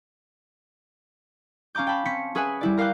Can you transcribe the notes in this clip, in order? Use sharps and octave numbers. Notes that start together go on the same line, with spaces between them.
C#4 F5 A#5 D6 G6
G5 A5 B5
C4 C#4 B6 C#7
C#4 G#4 B4 E5 F#5 G#5
G3 E4 D5
A#4 F5 G5 D6 F#6